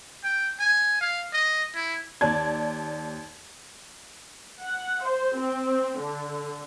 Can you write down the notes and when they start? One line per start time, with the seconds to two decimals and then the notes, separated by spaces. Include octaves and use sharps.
0.24 G5
0.60 G#5
1.01 F5
1.33 D#5
1.75 E4
2.21 D#2 D5 A5 G#6
4.61 F#5
5.04 C5
5.38 C4
6.00 D3